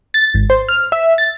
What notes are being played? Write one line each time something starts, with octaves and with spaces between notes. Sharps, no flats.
A6
G#1
C5
F6
E5
A6